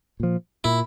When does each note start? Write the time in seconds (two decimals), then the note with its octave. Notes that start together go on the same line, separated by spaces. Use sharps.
0.20 A#2 F3
0.64 A#2 E4